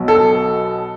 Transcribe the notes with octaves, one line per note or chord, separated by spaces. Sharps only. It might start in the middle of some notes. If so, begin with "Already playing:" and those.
Already playing: B1 B2 F#3
A4